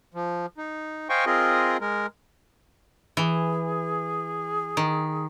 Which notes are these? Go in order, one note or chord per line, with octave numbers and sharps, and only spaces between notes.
F3
D#4
C5 D#5 F5 G5 G#5 C#6
C4 F4 G#4 A#4 D#5
G#3 A#4
E3 G#4
D#3